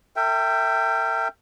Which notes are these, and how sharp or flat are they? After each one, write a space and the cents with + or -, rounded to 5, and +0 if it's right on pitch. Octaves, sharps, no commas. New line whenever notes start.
A#4 -45 E5 +0 G5 +0